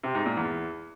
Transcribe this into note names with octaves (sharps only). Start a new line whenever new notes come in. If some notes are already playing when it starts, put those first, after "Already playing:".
C3
G#2
A#2
E2